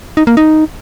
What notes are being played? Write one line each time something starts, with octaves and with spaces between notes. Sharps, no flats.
D#4
A#3
D#4